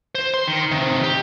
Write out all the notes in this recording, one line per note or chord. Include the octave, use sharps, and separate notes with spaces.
C5
C6
D#3
C3 D#3
G4